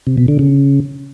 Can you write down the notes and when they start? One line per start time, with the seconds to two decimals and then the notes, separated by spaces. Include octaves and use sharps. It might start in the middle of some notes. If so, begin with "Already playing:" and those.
0.07 C3
0.17 B2
0.28 D3
0.39 C#3